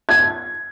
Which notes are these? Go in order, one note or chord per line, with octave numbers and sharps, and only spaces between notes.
G#6